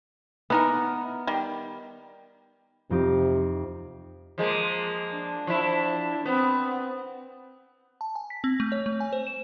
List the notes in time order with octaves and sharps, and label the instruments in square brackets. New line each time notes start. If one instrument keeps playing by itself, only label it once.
[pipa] E3 D#4 A#4 [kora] B3
[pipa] D#3 G3
[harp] F2 D#4 G4 [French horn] C3
[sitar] F3 G#3 A#3
[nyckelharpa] D4
[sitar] F3 E4
[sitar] B3 [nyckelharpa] C4
[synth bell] A5
G#5
B6
C4
A3
C#5
A3
G#5
C5
E7